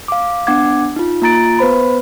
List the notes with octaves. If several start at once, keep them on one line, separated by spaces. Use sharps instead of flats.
F5 D6
B3 D4 F#5 D6 G#6
D#4 F4
A#3 F4 A#5 A6 D7
B3 B4 C5 B5